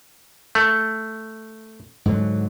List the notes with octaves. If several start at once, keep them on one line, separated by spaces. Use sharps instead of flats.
A3
G#2 D3 F#3